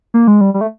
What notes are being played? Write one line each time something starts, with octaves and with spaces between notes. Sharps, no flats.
A#3
G#3
G3
G3
A3